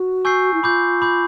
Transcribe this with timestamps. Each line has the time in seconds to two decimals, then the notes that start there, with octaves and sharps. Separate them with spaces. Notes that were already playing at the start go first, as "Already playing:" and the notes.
Already playing: F#4
0.25 G#5 C#6 E6 G6 C7
0.54 E4
0.63 F4 B5 D6 G6
1.02 B5 D6 G6